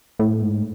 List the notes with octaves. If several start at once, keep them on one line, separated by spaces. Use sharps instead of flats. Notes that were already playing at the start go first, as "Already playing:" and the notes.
A2
G#2